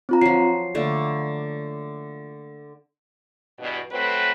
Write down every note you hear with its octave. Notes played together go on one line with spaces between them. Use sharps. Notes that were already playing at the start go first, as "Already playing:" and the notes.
C4 F4 A#5
F3 F#3 C7
D3 A3 A#3
E2 G2 B2
F#3 A3 C4 B4